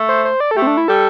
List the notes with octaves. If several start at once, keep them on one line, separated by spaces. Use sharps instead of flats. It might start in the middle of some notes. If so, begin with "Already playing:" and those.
Already playing: A3
C5
C5
D5
A4
A3 G4
C4
D4
E4
G3 A4